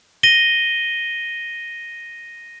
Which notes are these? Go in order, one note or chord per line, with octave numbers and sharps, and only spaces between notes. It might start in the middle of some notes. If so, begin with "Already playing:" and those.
A#6 D#7 G7